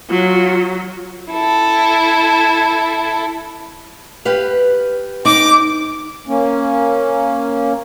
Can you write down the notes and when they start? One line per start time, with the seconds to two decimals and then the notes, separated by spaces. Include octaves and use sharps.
0.10 F#3 F4
1.32 E4 A4
4.25 G4 B4 F5
5.25 D#4 D6
6.27 A#3 C#4